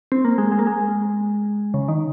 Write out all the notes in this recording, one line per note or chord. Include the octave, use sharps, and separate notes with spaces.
C4
A#3
G#3
G#3
A#3
G#3
C#3
D#3